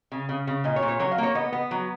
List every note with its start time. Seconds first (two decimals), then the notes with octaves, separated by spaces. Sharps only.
0.12 C#3
0.29 C#3
0.47 C#3
0.64 A#2 D#5
0.76 C#5
0.82 A#2
0.88 C#5
0.99 F#3 C#5
1.12 F5
1.18 A#3 C#5
1.35 B3 D#5
1.52 B3
1.71 F#3